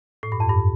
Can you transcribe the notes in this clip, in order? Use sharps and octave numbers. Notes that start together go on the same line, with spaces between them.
A2
G2
F2
G2